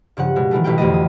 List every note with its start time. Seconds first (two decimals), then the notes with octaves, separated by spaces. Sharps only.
0.17 G2 C#3 F3 F#5
0.36 B2 G#3
0.51 D#3 E3 G3 A3
0.64 A1 B2 B4 G5
0.78 F2 D3 F#3 A3 D#5
0.94 D#6